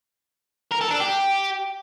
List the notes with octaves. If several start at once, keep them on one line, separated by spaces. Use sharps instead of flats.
A#4
A4
D4
G4